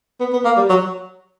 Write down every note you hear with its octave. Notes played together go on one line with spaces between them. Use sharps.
B3
B3
A#3
G3
F#3